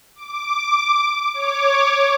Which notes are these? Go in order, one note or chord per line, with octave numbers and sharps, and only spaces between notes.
D6
C#5 D6